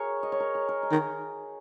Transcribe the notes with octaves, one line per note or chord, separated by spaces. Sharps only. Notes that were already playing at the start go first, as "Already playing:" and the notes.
Already playing: F#4 G#4 A#4 C#5
D#5
C#5
A#4
G#4
A#4
D#5
D#3